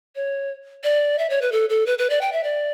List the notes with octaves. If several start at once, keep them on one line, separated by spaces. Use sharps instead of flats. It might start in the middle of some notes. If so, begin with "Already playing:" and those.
C#5
D5
E5
C#5
B4
A4
A4
B4
B4
D5
G5
E5
D5